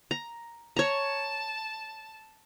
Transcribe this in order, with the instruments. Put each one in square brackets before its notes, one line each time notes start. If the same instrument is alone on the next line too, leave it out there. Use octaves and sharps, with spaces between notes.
[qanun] A#5
[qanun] C#5 A#5 [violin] A5